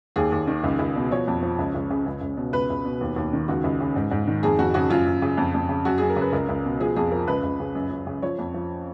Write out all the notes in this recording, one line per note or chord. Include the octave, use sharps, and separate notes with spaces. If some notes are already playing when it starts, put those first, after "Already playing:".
D#2 G#4
D#2
D#3
C#2
C#2
B2
F3 C#5
F2
F3
C#2
C#2
C#3
C#2
C#2
B2
C#2 B4
C#2
B2
D#2
D#2
D#3
C#2 F#4
C#2
C#3
G#2
G#2
D#3
F2 G#4
F2 F#4
C#3 F#4
F#2 F4
F#2
C#3
F2
F2
C#3
F#2 F#4
F#2 G#4
A#4
C#3
B4
C#2 A#4
C#2
B2
F3 G#4
F2 G#4
F3 A#4
C#2 B4
C#2
C#3
F#2
F#2
C#3
F3 C#5
F2
F3